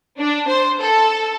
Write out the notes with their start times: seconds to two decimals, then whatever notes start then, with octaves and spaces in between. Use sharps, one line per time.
0.18 D4
0.47 C5
0.80 A4